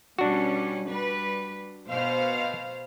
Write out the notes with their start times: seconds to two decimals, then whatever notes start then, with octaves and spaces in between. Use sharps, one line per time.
0.19 B2 G3 C#4 D4 F#4
0.87 G3 B4
1.89 B2 C5 F5